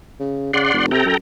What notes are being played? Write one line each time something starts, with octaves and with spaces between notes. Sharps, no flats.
C#3
C#3 D5 F#5 C6
F1
C3 A4 G5 A#5
F#2